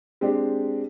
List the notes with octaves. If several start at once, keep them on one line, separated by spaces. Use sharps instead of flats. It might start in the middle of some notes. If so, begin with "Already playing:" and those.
G#3 C4 D4 G4